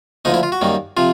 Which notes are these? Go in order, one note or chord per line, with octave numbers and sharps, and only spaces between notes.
D2 D3 F3 A#3 D#4
E4
F4
F#4
F#2 D#3 G3 A#3
C3 F3 F4